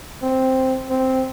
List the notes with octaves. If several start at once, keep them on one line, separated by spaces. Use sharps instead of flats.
C4
C4